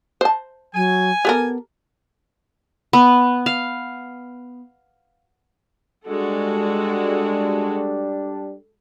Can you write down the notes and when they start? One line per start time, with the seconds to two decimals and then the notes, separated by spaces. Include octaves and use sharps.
0.21 C5 A5
0.74 F#3 G#5
1.25 B3 G4 A4 A#4
2.93 B3
3.46 F5
6.08 G3 G#3 D4 F#4 A4